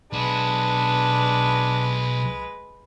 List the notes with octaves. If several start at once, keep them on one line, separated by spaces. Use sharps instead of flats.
B1 G#3 D4 F#4 B4